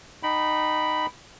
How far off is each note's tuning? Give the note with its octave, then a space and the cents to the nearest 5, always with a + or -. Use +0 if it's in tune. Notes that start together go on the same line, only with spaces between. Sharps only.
D#4 -15 G5 -25 B5 +0